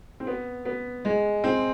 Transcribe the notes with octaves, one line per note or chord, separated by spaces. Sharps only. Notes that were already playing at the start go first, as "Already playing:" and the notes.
C4
B3
B3
G#3
C4